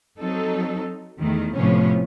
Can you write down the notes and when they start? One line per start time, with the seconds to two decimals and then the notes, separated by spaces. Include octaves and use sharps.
0.20 F#3 C4 D#4 A4
1.19 E2 D#3 A3
1.55 A2 C3 F3 B3 C#4 C#5